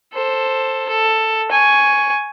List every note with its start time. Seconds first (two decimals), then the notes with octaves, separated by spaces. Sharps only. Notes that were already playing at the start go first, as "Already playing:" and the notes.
0.13 A4 C5
0.89 A4
1.51 G#5 C#6